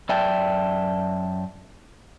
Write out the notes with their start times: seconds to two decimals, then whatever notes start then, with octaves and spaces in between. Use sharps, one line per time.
0.09 F#2 D5 E5 G5 A5